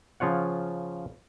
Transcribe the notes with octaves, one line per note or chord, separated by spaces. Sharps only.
C#3 F3 F4 C#5 F#5